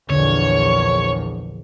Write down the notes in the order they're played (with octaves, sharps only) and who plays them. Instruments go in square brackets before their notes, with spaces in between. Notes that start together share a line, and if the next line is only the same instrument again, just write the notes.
[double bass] A#1 E2 [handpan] D3 D4 [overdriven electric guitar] C#5